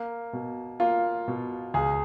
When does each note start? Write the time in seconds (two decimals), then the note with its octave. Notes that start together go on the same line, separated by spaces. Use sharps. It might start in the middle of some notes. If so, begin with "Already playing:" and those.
Already playing: A#3
0.33 B2
0.80 A#3 F4
1.28 B2
1.74 C#2 G#4